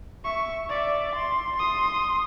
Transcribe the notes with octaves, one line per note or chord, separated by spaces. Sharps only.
E5 C#6
D5 E5
C6
C6 D#6